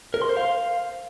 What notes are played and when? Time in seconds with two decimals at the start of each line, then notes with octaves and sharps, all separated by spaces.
0.14 A#4
0.22 C6
0.29 C5
0.37 F5